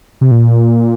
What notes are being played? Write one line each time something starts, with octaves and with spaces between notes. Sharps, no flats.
C3
A#2